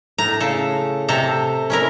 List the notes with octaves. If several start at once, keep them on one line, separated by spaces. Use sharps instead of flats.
A2 A#5
C#3 A4
C3 A4 A#5
C#4 E4 A#4